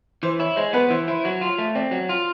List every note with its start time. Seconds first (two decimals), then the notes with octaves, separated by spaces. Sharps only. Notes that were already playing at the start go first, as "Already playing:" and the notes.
0.23 E3 C5
0.39 E4 C#5
0.56 G#3 C5
0.73 B3 B4
0.90 E3 C5
1.07 E4 C5
1.24 F#3 C#5
1.41 F4
1.59 A3
1.75 C4 D5
1.91 F#3
2.09 F4